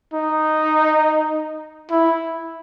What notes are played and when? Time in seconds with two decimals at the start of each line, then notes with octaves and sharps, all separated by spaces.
0.14 D#4
1.91 E4